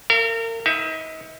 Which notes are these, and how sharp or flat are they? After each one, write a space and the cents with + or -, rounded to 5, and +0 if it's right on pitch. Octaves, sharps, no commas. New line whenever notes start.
A#4 -35 F5 -45
D#4 +40 B4 +0 E5 +30